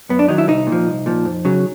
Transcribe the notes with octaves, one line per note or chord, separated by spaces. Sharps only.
F#2 B3
D4
D#3 F#3 D#4
E4
C2 D#4
A#2
F3
C2
A#2 F3
F2
C#3 F#3